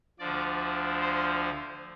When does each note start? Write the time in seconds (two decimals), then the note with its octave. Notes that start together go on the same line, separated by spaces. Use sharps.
0.19 D2 D3 F3 D5
1.01 C5